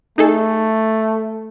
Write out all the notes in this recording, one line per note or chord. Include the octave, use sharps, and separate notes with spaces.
A3 D#4 G#4 A4